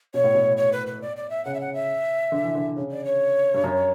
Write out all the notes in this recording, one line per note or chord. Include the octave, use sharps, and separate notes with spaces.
B2 C#5
A2
B2
C#5
B4
B4
D5
D5
E5
C#3 F#5
E5
F#5
E5
D3
E3
D3
C#3
D5
C#5
G2
F#2